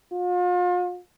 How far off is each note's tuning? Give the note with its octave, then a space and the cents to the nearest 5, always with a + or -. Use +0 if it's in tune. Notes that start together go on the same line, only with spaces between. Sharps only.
F4 +40